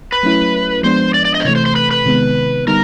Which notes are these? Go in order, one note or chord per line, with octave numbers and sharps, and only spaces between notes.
B4
F#3 A3 C#4 E4
F3 G#3 B3 D4 C5
D5
D5
D#5
C5
C3 E3 A3 C#5
C5
C5
B4
B4
C3 D#3 G#3 B3
D3 G3 B3 D#4 A#4